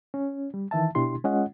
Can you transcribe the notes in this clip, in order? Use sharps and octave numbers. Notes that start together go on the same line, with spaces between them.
C#4
G3
D#3 E3 E5 A5
B2 D4 E4 G4 C6
G#3 C#4 F4 D#5 F#5